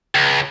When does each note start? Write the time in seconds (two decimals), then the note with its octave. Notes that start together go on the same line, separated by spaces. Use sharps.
0.15 C#2